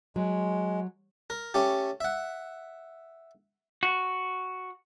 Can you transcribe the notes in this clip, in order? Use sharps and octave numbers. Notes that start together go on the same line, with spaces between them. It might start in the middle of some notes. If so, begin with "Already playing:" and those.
F#3 G#3
A#4
A3 C#4 G4
E5 F#5
F#4